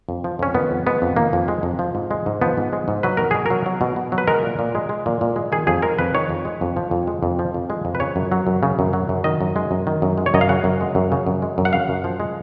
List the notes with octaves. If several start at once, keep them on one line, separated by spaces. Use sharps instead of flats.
F2
F3
F2 C#4
D#3 B3
F2
G#3 B3
F2
D#3 A#3
F2
G#3
F2
F3
G#2
G#3
G#2
F3 B3
G#2
G#3
G#2
F#3 B4
B2 A#4
B2 G#4
F#3 A#4
F#3
B2
B2
F#3
B4
G#3 A#4
A#2
A#2
G#3
G#3
A#2
A#2
G#3
D#3 G#4
F2 G#4
G#3 A#4
F2 B4
D#3 C#5
F2
G#3
F2
F3
F2
G#3
F2
F3
F2
G#3
F2
B4
C#3 C#5
F#2
F#3
F#2
C#3
F#2
F#3
F#2
D#3 D#5
F#2
G#3
F#2
D#3
F#2
G#3
C#5
F#2 D#5
F5
C#3 F#5
F#2
G#3
F#2
C#3
F#2
G#3
F#2
F#5
C#3 F5
F#2
F3
G#3